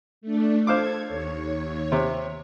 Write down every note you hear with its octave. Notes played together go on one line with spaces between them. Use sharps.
A3 D4
A4 C5 F5 D6 G#6
D#2 C#5
C3